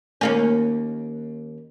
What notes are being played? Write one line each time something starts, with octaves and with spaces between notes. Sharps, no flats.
D#2 A#3 C#4